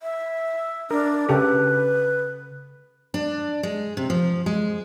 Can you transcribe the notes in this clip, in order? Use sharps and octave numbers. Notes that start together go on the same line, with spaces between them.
E5
D4 A#4
C#3 G4 A4 B4
D4
G#3
C3
F3
G#3